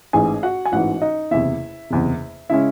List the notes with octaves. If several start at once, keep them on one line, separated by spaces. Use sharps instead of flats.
A1 G#2 E3 G#4 G#5
F#4 F#5
G#5
A1 G#2 E3 F#4 F#5
D#4 D#5
F#1 E2 C3 E4 E5
F#1 E2 C3
C#3 G#3 C#4 E4 E5